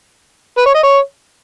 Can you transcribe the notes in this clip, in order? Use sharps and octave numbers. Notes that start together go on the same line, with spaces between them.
B4
C#5
D#5
C#5